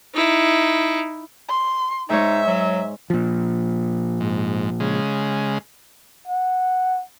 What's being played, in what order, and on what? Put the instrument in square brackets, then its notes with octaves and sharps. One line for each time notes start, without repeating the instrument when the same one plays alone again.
[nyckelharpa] D#4 E4
[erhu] C6
[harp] G#2 G#3 C#5 [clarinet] D#4 [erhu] E5
[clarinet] F#3
[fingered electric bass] A#2 F3
[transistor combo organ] G#2
C#3 G#3
[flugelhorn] F#5